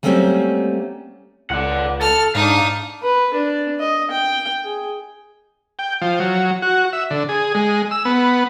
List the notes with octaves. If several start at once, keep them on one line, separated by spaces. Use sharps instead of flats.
F#3 G3 A3 A#3 C4 C#4
C#2 D5 F#5
A4 F6
G#2 D4 D#4 F5
B4
D4
D#5
G5
G#4
G5
F3
F#3
F#4
E5
D3
G#4
G#3
E6
B3